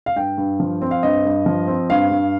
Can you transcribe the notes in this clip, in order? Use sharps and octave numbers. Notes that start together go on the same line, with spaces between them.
F5
G2 G5
G2
F3
C4
F5
G2 D#5
G2
F3
C4
G2 F5
G2